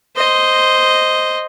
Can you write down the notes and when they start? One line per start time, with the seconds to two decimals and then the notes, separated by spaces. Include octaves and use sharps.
0.16 C5 D#5